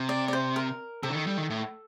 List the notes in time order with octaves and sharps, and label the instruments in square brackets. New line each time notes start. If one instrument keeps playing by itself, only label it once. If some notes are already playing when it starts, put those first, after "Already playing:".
Already playing: [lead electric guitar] C3
[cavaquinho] D5
D5
C5
A#4
[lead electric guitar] C3 [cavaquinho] A4
[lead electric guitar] D3
D#3
G3
D#3
A2